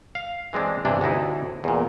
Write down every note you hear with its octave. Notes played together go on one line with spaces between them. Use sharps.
F5
E3 G#3 C4 D4
G2 C3 E3 D4
D2 A2 D#4 E4
E2 A#2